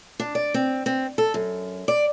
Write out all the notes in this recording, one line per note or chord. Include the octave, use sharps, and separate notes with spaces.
D4
D5
C4
C4
A4
F#2
D5